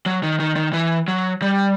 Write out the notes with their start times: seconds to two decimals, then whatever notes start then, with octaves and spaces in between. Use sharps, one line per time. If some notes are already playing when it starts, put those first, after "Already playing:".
0.06 F#3
0.23 D#3
0.40 D#3
0.56 D#3
0.73 E3
1.08 F#3
1.42 G3